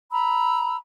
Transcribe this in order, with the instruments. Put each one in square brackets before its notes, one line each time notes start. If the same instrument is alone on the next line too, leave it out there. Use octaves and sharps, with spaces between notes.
[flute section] A#5 B5 E6